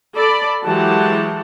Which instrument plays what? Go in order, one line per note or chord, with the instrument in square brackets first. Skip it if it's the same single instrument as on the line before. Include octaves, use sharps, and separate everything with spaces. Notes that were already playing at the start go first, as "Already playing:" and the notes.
[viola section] A4 D5 B5
E3 F#3 G#3 G4 F#5 A5